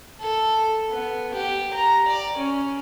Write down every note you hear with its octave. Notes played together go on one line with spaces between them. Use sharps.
A4
B3
G4
A#5
D5
C#4